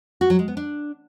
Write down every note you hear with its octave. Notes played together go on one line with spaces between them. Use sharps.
F#4
F#3
G#3
B3
D4